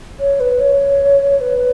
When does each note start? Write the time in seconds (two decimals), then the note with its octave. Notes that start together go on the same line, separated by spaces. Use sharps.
0.20 C#5
0.40 B4
0.60 C#5
1.41 B4